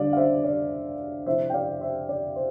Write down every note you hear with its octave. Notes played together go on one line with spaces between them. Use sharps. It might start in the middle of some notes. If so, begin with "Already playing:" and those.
Already playing: D3 G3 D4 D5 F5
F5
C5 E5
D5
C3 F3 C4 E4 C5 E5
G5
D5 F5
C5 E5
D5
C5